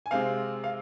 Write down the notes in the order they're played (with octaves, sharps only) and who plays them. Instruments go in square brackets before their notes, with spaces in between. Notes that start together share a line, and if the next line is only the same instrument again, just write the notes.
[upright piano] G#5
C3 G#3 C4 F5
F5